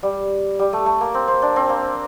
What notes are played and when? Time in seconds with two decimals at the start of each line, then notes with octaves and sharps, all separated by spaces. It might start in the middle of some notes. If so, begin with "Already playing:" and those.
0.03 G3
0.59 G3
0.73 A3
0.86 A3
1.01 A#3
1.14 C4
1.28 C4
1.42 D4
1.56 C4
1.69 A#3